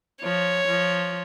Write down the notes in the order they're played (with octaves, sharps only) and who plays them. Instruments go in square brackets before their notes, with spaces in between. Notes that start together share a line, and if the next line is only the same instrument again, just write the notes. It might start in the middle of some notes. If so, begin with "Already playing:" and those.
[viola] F3 [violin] C#5
[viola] F3